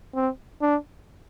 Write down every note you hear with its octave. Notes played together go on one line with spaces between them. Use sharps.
C4
D4